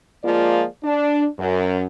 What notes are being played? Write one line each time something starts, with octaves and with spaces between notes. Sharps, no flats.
F3 G#3 A#3 F4 D5
D4
F#2